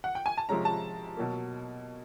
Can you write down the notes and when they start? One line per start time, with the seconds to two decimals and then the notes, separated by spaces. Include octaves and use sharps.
0.04 F#5
0.15 G5
0.26 G#5
0.38 A5
0.49 C3 F3 G#3 C#4 A#5
0.65 A5
1.17 B2 F#3 A#3